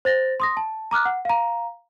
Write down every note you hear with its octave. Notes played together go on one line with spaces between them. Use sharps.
C5 A6 A#6
C6 D#6 A#6
A5
A#5 D6 F6 F#6
F#5
F5 A#5